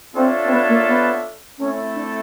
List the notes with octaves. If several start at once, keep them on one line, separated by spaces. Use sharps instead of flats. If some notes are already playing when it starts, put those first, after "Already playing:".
C4 D4 F4 A4 C#5 E5
C4
B3
A#3
B3
A3 C4 C#4 E4 A4
D4